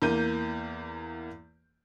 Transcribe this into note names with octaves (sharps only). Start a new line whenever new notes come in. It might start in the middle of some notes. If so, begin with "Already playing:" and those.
E2 A#3 G6 D#7